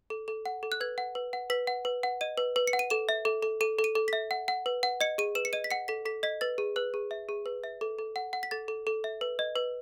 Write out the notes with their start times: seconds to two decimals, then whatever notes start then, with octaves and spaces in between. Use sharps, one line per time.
0.10 A4
0.28 A4
0.46 F#5
0.63 A4
0.72 F#6
0.81 B4 G#6
0.98 F#5
1.15 B4
1.33 F#5
1.50 B4 B6
1.67 F#5
1.85 B4
2.03 F#5
2.21 D#5 D#7
2.38 B4
2.56 B4
2.67 C#7
2.73 F#5
2.79 D#7
2.90 A4 E7
3.09 E5
3.25 A4
3.43 A4
3.61 A4 D#7
3.79 A4
3.84 D#7
3.95 A4
4.08 E5 B6
4.31 F#5
4.48 F#5
4.66 B4
4.83 F#5
5.01 D#5 C#7
5.18 G#4 D#7
5.35 B4 E7
5.45 C#7
5.53 D#5 D#7
5.64 B6
5.71 F#5 C#7
5.88 A4 B6
6.06 A4 B6
6.23 D#5 B6
6.41 B4 A6
6.58 G#4
6.76 B4 F#6
6.94 G#4
7.11 E5
7.29 G#4
7.46 B4
7.64 E5
7.81 A4
7.99 A4
8.16 F#5
8.33 F#5
8.43 B6
8.51 A4 A6
8.68 A4
8.87 A4
9.04 E5
9.21 B4
9.39 D#5
9.56 B4